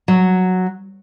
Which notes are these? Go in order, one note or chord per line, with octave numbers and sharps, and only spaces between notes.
F#3